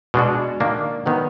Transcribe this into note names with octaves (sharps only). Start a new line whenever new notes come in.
B2 G#3 D4 F#4
D#3 A#3 D4
D#3 F#3 B3